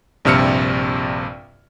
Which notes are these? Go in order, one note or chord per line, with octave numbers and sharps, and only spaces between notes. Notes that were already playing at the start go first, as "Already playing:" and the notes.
A#1 G2 C3 E6 F6 C#7